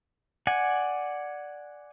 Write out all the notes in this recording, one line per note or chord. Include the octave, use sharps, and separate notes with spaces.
D5 F#5 G#5